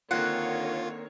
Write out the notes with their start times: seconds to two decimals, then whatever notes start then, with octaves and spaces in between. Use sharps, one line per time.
0.11 D3 D#3 A#3 C4 F4 C#5 F#5